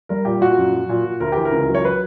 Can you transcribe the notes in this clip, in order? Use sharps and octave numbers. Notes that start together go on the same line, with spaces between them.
G3 A#4
A#2 G4
A#2 F#4
F#2
F#3
A#2
A#2
D2 A#4
E3 G4
A#4
C#2
F#3
C#5
B4